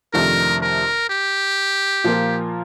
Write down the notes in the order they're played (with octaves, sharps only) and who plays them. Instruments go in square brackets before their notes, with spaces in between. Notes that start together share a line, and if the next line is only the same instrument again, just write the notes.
[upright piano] F2 C3 D#3 A3 D4 [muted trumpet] A#4
[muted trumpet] A#4
G4
[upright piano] A#2 F3 A#3 F4